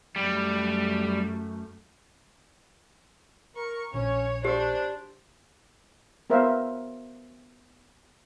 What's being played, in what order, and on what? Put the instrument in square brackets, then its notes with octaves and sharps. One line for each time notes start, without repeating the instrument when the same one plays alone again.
[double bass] F#2 A3 [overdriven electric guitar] G3
[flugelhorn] A#4 [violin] C#6
[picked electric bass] A#1 [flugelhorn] C#4 [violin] C#5
[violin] D4 [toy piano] G4 [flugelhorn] C5
[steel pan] B3 A#4 C5 E5 F5